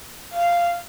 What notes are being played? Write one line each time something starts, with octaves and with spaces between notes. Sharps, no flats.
F5